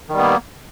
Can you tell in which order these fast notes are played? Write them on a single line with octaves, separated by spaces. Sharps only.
D#3 G3 B3 A#3